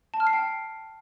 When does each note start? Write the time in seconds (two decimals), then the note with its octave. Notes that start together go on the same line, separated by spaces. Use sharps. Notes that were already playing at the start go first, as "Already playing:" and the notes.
0.14 A5
0.20 F6
0.27 C7
0.33 G5